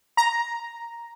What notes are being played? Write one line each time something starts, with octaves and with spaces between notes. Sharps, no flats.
A#5